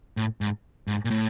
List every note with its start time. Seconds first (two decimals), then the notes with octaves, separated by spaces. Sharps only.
0.17 A2
0.41 G#2
0.88 G#2
1.05 A#2
1.11 A2